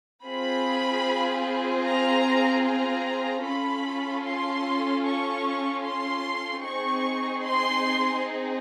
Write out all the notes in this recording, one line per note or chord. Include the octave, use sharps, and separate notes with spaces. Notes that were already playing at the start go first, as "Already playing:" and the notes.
C4 F4 G#4 B5
A#5
A#5
C#4 F4 A4 B5
C6
C#6
C6
C4 D#4 G#4 C#6
C6